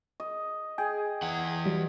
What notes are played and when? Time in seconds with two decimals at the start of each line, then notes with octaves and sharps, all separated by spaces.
0.20 D#5
0.78 G#4 G5 G#5
1.22 E3 F#5
1.66 F#3 G3